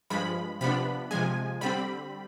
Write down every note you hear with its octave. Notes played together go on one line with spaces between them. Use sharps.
G2 F3 G#3 B5
C3 F3 B3 D4 B5
C3 F3 G#3 G#5
D3 G3 C4 B5